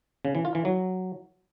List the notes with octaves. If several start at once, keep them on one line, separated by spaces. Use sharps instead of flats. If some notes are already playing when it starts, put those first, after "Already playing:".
C#3
E3
F4
E3
F#3